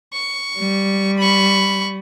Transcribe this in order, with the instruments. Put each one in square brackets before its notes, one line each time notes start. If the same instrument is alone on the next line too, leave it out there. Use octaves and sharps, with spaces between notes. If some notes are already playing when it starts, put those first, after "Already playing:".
[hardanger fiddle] C#6
[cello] G3
[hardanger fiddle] B5 C#6